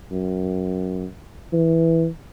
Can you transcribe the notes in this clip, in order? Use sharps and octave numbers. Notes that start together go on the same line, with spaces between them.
F#2
E3